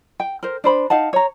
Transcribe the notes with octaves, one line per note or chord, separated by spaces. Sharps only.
G5
A#4 C5
D4 C5 B5
D#4 F5 F#5 A5
C#5 A#5